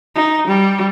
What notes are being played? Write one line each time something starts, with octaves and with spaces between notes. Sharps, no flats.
D#4
G3